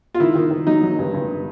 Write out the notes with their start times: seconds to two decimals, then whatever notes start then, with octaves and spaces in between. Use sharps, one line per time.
0.14 F4
0.20 D#3 E4
0.35 D#3
0.51 D#3
0.67 F#3 D#4
0.83 F#3
0.99 G2
1.14 G2